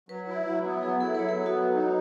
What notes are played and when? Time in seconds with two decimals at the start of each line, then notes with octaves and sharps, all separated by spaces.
0.09 F#3 B4
0.28 E4
0.46 F#3
0.65 B3
0.82 F#3 G#4
1.01 E4 A4
1.14 B4
1.19 F#3 C#5
1.29 A4
1.38 B3
1.46 F#4
1.55 F#3
1.73 D#4